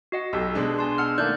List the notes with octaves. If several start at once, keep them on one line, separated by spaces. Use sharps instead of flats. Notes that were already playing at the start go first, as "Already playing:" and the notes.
F#4 D#5 F#5
B1 G4 A4 E6
B2 G#3 D4
G#5 A5 C6
F#5 E6 F6
D#3 A3 A#3 D5 F#6 G6